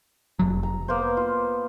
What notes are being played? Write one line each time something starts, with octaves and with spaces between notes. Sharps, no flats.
F1 F#3
A#5
A#3 B3 C5
F4